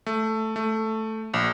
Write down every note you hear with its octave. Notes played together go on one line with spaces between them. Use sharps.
A3
A3
A#1